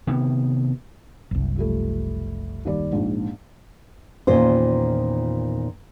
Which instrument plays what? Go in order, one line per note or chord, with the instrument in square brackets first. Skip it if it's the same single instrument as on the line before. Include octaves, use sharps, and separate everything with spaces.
[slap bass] C3 D#3 B3
[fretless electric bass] F#1 C2
[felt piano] F3 G3 A3
D#2 G3 D5
A#1 G#2
[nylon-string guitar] E2 A#2 D#3 C#4 F4 C5